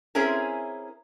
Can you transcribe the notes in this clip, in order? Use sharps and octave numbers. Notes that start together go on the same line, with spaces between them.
C4 C#4 E4 G#4 A#4